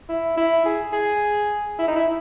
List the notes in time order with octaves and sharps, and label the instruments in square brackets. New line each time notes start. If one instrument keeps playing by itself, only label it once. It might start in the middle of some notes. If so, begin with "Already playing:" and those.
[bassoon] E4
E4
G#4
G#4
E4
D#4
E4